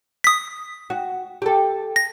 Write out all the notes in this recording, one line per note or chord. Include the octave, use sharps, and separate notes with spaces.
D#6 B6
F#4
G4 A4
A#6